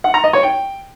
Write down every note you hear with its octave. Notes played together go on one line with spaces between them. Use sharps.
F#5
A#5
D#5
C#5
G5